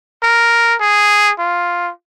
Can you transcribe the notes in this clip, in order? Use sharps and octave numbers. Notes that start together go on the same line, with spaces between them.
A#4
G#4
F4